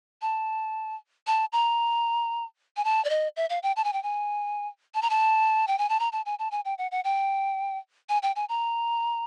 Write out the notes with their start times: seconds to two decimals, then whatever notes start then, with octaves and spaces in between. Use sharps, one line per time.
0.22 A5
1.27 A5
1.53 A#5
2.77 G#5
2.84 A5
3.05 D5
3.10 D#5
3.37 E5
3.50 F5
3.63 G5
3.76 A5
3.84 G#5
3.93 G5
4.03 G#5
4.94 A5
5.02 A#5
5.10 A5
5.67 G5
5.78 G#5
5.89 A5
6.00 A#5
6.12 A5
6.26 G#5
6.39 A5
6.51 G#5
6.65 G5
6.78 F#5
6.91 F#5
7.04 G5
8.09 G#5
8.23 G5
8.36 G#5
8.49 A#5